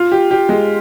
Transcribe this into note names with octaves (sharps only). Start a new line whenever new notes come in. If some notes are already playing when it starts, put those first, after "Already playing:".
Already playing: F4
G4
G4
G#3